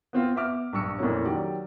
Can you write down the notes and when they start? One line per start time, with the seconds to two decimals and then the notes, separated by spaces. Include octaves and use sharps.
0.13 B3 C4 F4
0.36 B3 E5 D6 F6
0.73 A#1 G2 C#6 E6 C#7
0.98 F2 A#2 E3 A3 A#3 C#4
1.26 D#3 F#3 G4 D5